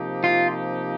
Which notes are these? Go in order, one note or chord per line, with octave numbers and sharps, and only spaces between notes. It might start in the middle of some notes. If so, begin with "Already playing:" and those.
Already playing: C3 F3 A#3 D#4 G4
F4